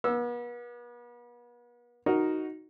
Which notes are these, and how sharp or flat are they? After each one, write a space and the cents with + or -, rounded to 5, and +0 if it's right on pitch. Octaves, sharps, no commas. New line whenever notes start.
B3 -40 E6 +0
D#4 +0 F#4 +0 A#4 +0